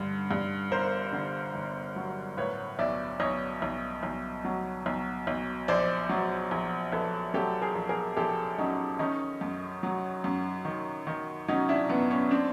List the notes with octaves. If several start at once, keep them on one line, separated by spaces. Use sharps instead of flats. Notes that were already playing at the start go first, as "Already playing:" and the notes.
Already playing: G2 D3
G2
G1 A#4 C5
D3
G1
F#3
A2 B4 C#5
B1 D5 E5
B1 C#5 D#5
B1
B1
F#3
B1
B1
A#1 C5 D5
F#3
A#1
A#1 A4 B4
F#3 G4 A4
G#4 A#4
A#1
G#4 A#4
A#1 G4 A4
F#3 C#4 D#4
D#3 C#4 D#4
F#2
F#3
F#2
D#3
D#3
F#3 C#4 D#4
D4 E4
F#2 B3
B3 C#4
C4 D4